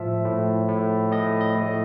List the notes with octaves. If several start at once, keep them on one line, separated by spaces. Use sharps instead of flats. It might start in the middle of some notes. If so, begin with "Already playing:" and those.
Already playing: A2 F3 E5
A2
A2
A2 D#5
D#5
A2